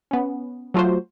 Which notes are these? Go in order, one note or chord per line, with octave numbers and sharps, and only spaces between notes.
B3 C#4
F#3 A3 F4 F#4 C5